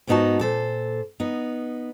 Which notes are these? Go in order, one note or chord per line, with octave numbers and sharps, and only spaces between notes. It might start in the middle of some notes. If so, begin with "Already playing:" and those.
G#2 G#3 B3 D#4 F#4 A5
A#2 A4 C5
B3 D#4